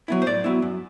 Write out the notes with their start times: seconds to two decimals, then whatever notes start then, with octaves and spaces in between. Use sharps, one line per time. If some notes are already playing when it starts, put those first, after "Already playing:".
0.08 F#3 B3 E4
0.22 C5
0.26 A2 D5
0.44 F#3 B3 E4
0.62 F#2